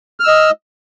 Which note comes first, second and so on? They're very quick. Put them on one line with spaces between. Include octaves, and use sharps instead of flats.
F6 E6 D#5